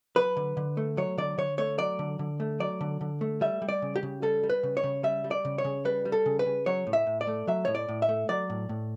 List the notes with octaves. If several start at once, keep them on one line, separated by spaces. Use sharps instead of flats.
F#3 B4
D3
D3
A3
F#3 C#5
D3 D5
D3 C#5
A3 C#5
F#3 D5
D3
D3
A3
F#3 D5
D3
D3
A3
G3 E5
G3
D5
C#3
G4
C#3
G3 A4
G3
B4
C#3
C#5
C#3
G3 E5
G3
D5
C#3
C#5
C#3
G3 B4
G3
A4
C#3
B4
C#3
F#3 C#5
A2
E5
A2
D5
A3
F#3 E5
A2 C#5
D5
A2
E5
A3
F#3 D5
A2
A2